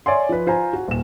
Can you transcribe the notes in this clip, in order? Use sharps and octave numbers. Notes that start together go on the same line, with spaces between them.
C#5 D5 E5 G#5 C6
F3 B4
F4 C5 G#5 A#5
F#4
D#1 E7